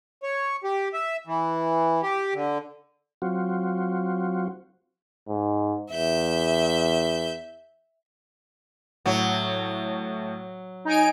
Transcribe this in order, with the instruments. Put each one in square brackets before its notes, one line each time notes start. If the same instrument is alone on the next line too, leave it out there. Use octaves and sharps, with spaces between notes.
[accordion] C#5
G4
E5
E3
G4
D3
[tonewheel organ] F#3 C4 F4 F#4
[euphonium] G#2
[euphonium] E2 [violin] E5 G6
[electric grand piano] A2 [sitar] F#3
[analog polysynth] D#4 G#5 D7